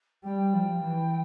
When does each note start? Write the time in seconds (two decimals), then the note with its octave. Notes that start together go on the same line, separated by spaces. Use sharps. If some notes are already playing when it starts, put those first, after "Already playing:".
0.23 G3 G5
0.53 F3
0.83 E3